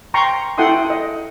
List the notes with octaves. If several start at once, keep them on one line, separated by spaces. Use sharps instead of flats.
G5 A#5 C6 C#6
E4 A4 F#5 G5 C6 D#6
D#5